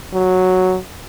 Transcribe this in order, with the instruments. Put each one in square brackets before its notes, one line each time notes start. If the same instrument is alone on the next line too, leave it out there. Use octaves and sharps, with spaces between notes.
[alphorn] F#3